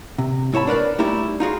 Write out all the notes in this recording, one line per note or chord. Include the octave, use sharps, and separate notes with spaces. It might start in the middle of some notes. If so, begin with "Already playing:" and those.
C3
G#2 E4 C#5 A5 B5
D4 A#4 B4 D5
G3 A3 D#4 E4 G4
D#4 F4 F#4 G#4